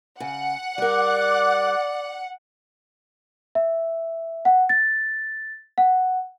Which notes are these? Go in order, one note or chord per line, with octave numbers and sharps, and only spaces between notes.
C#3 F#5
G3 A#4 D5 D6 F#6
E5
F#5
A6
F#5